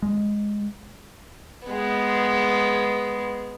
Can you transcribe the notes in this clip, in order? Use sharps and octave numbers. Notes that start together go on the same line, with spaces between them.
G#3
G#3 B3